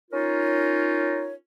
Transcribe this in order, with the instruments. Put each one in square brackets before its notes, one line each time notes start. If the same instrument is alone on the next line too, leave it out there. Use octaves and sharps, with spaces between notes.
[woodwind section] C#4 D#4 F4 A#4 C#5